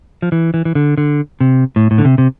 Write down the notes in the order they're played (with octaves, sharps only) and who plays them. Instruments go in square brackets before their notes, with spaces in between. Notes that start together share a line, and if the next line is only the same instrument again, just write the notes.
[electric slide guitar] F3
E3
E3
E3
D3
D3
C3
A2
A2
D3
C3
C3